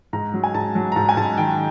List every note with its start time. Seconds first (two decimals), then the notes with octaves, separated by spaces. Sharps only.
0.13 G#2 A#5
0.34 F#3
0.44 G#5
0.54 G#2 A5
0.75 F#3
0.92 A#5
0.96 G#2 A5
1.09 G#5
1.17 G#2 A5
1.38 D#3 G5